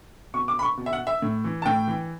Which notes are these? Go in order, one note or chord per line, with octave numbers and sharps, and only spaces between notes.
B2 C#6
D6
B5
C#6
B2
E5
F#5
E5
A2
E3
A5
A2 G5
E3